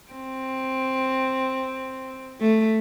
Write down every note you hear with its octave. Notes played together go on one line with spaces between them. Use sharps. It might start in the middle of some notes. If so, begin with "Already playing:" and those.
C4
A3